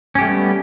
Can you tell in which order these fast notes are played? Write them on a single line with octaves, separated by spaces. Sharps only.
C#4 G4 A3 G3 B3